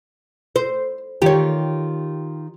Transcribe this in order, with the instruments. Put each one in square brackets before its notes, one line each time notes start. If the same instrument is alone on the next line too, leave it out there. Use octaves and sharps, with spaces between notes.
[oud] C5
[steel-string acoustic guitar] D#3 F4 [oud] G4 C#5